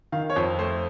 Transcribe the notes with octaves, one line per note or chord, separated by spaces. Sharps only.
D#3 F5
C#5
F2 C5
A3 C5